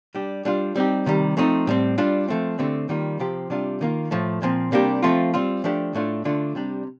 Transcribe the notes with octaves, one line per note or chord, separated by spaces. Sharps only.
G3 D4 G4
G3 D4 F4
G3 C4 D#4 G4
C3 D#3 G3
F3 A3 C4 D#4
A2 G3 C4
G3 D4 F4
F3 A3 C4
D3 A3 C4 G4
D#3 G3 A#3 F4
C3 F3 C4 G4
C3 G3 D4 F4
D#3 A#3 F4
A2 F3 A3
A#2 F3 C4
C3 G3 A#3 D4 G4
F3 A3 C4 F4
G3 C4 F4
F3 A3 D4 G4
A2 A3 D4 F4
D3 A3 D4 F4
C3 G3 D4